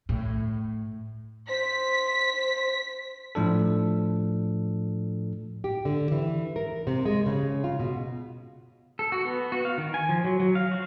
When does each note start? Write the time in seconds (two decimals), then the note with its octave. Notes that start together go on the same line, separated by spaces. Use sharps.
0.09 A2
1.49 C5 B6
3.35 A2 F3 D4 A4
5.64 G4
5.85 D3
6.12 E3
6.56 A#4
6.87 C3
7.05 G#3
7.26 C#3
7.64 F4
7.79 B2
8.99 A4
9.12 F#4
9.25 B3
9.52 F#4
9.65 F5
9.78 D#3
9.94 G#5
10.09 F3
10.24 F#3
10.40 F#3
10.55 F5
10.71 F#4